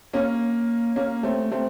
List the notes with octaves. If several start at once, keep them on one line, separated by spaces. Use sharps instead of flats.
A#3 C#4
A#3 C#4
A3 C4
A3 C4